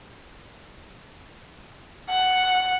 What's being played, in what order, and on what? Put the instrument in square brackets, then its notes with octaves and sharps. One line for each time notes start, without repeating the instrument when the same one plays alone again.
[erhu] F#5